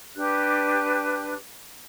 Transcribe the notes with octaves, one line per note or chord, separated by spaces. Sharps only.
D4 G4 B4 F#6